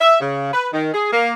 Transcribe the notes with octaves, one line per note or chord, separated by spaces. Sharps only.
E5
C#3
B4
D#3
G#4
A#3